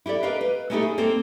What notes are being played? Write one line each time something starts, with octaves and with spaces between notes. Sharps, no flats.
E4 G4 A4 D5
G4 A#4 B4 D#5 F5
B4
A3 C#4 D#4 E4 G4 A4
G#4
A#3 C4 A4